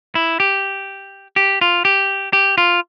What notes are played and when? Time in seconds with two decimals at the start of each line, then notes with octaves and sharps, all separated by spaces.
0.15 E4
0.40 G4
1.36 G4
1.61 F4
1.85 G4
2.33 G4
2.58 F4